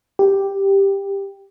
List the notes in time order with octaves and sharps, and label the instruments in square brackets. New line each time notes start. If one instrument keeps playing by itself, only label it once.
[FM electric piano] G4